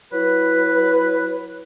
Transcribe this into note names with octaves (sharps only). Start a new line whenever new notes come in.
F#3 E4 B4